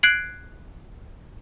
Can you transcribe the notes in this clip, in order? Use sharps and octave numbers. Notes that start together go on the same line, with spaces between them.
F#6 G#6 C7 D7 F#7